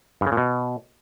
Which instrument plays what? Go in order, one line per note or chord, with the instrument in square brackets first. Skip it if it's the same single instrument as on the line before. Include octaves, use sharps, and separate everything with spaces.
[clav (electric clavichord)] G2
C#3
A#2
B2